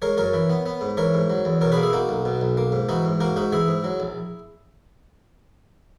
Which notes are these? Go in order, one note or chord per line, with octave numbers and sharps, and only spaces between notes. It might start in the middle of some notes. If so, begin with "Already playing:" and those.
G#3 A#4 C#5
F#2 A#4 C#5
E3
B3
B3
G#2
E3 A#4 C#5
G#2
F#3
E2
B2 A#4 C#5
G#4 B4
A#3
E4 G#4
A#3 D#4 F#4
B1
B2
B1
A#3
G#2
E3 D#4 F#4
G#2
A#3 F#4 A#4
G#2 D#4 F#4
E3 E4 G#4
G#2
F#3
A#1